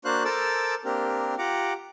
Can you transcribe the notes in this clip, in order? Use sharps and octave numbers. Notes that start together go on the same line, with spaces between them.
A#3 D4 F#4 C5 F5 F#6
A4 A#4 C5 A5 D6 E6
A#3 C4 D4 G4 A#4
F4 G4 F#5 A#5 D6